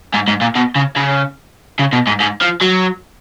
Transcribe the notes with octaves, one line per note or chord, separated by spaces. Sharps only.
G#2
G#2
A#2
B2
C#3
C#3
C#3
B2
G#2
G#2
F3
F#3